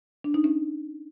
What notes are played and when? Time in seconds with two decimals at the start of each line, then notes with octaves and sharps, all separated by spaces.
0.24 D4
0.34 D#4
0.44 C#4